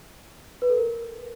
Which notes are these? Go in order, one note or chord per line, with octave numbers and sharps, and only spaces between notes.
B4
A4
A#4